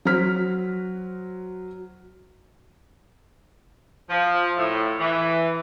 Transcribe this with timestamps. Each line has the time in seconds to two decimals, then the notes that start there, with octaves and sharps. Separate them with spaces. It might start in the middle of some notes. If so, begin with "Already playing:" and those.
0.05 F#3 F#4 C5 F6 B6
4.10 F3
4.58 A2
5.00 E3